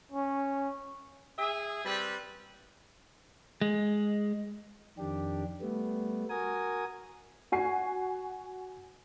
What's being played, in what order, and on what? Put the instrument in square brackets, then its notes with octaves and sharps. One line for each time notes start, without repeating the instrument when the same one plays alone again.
[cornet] C#4
[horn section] G#4 E5 G#5
G3 C4 B4
[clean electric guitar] G#3
[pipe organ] F2 D#3 D4 G4
G3 A3 B3
F#4 A#4 G#5 D#6
[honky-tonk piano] F#4 G#5 C7